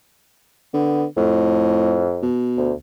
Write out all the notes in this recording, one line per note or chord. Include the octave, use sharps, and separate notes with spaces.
D3 B3
F2 A2
B2
D2